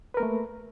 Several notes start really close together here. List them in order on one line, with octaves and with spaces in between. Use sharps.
B4 A#4 A#3 A3